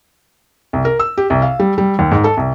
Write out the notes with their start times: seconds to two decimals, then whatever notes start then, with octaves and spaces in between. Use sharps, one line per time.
0.73 C2
0.85 A#4
1.00 E6
1.18 G4
1.30 C2
1.42 F5
1.60 G3
1.78 G3
1.99 D#2
2.11 G#2
2.24 A4
2.37 C2